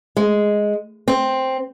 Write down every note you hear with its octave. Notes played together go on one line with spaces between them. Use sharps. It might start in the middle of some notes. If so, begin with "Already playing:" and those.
G#3
C4